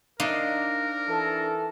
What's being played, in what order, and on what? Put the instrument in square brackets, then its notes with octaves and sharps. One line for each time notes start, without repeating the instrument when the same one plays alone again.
[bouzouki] D4 C5 F5 [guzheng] D#4 [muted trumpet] A#4
[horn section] E3 A4